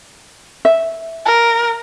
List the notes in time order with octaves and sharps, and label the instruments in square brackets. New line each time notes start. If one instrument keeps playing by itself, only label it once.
[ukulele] E5
[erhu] A#4